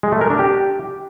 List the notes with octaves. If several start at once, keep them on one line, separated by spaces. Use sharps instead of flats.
G#3
A3
A#4
D4
G4